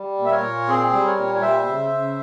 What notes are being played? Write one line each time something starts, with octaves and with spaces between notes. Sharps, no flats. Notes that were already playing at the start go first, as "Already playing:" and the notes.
Already playing: G3
A#2
E5
A#4 C#5
A#2
C4 G#4 C5
G3
A#4 C#5
A#2
C#5
G3 C5 E5
C#3
C#3